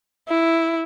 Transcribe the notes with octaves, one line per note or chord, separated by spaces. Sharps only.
E4